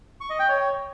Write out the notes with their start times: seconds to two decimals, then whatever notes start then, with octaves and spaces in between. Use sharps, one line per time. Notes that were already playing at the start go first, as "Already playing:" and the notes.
0.20 C#6
0.30 D#5
0.39 G5
0.49 C#5